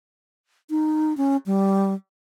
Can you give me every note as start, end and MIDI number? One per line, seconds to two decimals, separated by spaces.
0.70 1.15 63
1.17 1.37 61
1.46 1.94 55